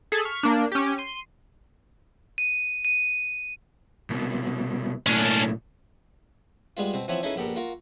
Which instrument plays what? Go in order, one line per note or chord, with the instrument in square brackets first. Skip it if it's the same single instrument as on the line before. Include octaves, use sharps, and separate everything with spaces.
[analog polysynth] G#4 A4 E6 B6
C#6 F6 B6
A#3 D4
C#4 G4
C6 D#7
[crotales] D#7
D#7
[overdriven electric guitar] C2 B2
[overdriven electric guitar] B1 A2 [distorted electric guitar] C#4 D4
[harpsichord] G3 G#3 B3 F4
B2 C4
E3 F3 B3 C4 B4 C#5
C#4 D#4 E4 G#4 A4 B4
A#1 B3 G4 A4 A#4
F4 F#4 A#4